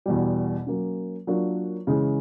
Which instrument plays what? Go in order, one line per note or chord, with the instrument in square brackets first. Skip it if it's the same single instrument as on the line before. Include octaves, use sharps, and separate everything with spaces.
[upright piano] E2 B2 G3
F#3 A#3 C#4
F#3 A#3 D4 F4 A#4
C#3 E3 G#3